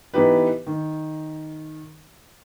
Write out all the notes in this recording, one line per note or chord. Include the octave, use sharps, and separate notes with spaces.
E3 B3 D#4 G4 B4
D#3